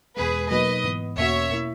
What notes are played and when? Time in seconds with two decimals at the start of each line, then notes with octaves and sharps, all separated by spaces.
0.17 E2 B2 G#3 G#4 B4
0.50 B2 F#3 A#3 D#4 B4 D#5
0.84 G#2 E3 B3
1.17 E2 B2 A#3 C#4 F#4 C#5 E5
1.51 B2 A#3 E4